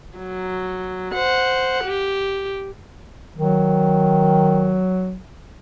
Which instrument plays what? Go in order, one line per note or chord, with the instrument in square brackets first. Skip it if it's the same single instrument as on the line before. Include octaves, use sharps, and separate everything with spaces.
[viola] F#3
C5 F#5
G4
[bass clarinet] D#3 [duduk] F#3